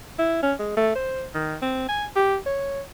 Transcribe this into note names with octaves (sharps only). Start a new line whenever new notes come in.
E4
C#4
G#3
A3
C5
D#3
C4
G#5
G4
C#5